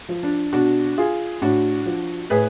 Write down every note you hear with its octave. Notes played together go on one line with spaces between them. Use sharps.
F3
D4
B2 D4 F#4
F4 G#4
A2 D4 F#4
F3
A2 G#4 B4